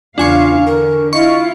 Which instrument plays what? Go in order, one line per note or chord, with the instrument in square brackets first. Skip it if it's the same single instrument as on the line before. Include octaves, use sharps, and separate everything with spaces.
[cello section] E2 C#3 F5 [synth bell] D4 G#5 C#6 [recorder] F4
[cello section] D3 [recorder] A#4
[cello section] E4 F4 F5 [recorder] D#5 [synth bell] C#6